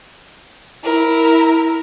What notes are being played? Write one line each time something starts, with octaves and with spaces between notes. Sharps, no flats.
E4 A#4